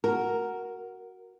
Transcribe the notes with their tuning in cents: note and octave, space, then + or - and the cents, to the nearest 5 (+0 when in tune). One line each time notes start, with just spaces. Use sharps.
F#4 +0 A#4 +0